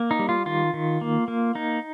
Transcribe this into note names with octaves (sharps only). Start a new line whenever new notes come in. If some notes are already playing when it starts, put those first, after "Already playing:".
Already playing: A#3
D#4
G3
F4
D#3 F4
D#3
A#3
A#3
A#3 D#4